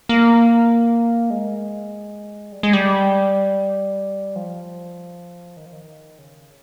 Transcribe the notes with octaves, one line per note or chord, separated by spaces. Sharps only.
A#3
G#3
G3
G#3
G3
F3
D#3
F3
D#3
C#3